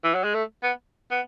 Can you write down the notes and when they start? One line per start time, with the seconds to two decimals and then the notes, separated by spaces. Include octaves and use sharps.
0.04 E3
0.15 F#3
0.24 G#3
0.34 A3
0.63 B3
1.11 B3